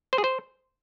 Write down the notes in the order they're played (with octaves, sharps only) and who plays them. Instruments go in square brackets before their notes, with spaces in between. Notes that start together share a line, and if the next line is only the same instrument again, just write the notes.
[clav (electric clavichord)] C5
G#4
C5